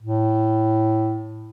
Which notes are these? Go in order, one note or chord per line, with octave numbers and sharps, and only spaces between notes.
A2